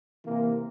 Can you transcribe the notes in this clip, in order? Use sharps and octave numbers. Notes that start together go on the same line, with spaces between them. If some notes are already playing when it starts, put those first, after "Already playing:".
C3 E3 A#3